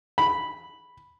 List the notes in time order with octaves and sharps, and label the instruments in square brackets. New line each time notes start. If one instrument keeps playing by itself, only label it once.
[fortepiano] B5